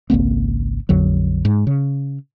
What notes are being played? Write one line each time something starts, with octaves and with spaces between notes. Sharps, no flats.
G#1 C#2 A#3 C4
A#1 F2 D3 F#3
G#2
C#3